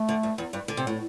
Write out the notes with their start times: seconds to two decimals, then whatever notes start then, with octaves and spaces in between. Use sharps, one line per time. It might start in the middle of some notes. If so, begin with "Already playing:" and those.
Already playing: A3
0.09 D3
0.23 G2
0.38 E2
0.53 G2
0.68 D3
0.77 C3
0.87 A2